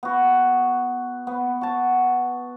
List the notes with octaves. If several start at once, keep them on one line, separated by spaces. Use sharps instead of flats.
B3 F#4
B3
F#4 A5